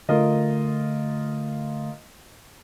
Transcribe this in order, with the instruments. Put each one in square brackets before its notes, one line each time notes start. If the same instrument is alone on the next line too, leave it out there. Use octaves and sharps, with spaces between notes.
[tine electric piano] D3 A3 [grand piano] F4 A#4 D#5